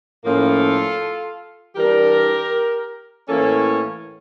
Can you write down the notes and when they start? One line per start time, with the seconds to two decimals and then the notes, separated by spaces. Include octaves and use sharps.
0.24 A2 F3 A#3 C#4 F4 A4
1.76 E3 G3 D4 G4 A#4
3.27 A2 E3 A#3 C#4 A4 C#5